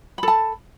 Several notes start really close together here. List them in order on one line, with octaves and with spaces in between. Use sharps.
B5 A4 A5